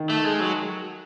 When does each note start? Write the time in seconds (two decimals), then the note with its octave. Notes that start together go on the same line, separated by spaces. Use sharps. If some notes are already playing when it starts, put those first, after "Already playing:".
Already playing: D#3
0.10 A3
0.25 G#3
0.40 F#3